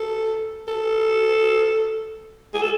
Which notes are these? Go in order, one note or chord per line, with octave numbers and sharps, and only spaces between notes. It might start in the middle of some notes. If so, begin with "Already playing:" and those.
Already playing: A4
A4
G#4
A4